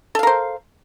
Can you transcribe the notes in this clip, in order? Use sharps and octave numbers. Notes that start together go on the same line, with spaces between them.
A4 A#4 C5 F5